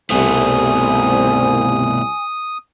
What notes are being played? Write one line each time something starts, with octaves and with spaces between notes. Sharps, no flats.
C2 B2 A3 G#5 D#6